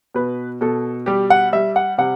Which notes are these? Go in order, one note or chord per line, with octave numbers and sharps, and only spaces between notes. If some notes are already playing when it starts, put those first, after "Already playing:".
B2 B4
B2 A4
G3 G4
F#5
G3 E5
F#5
C3 F#5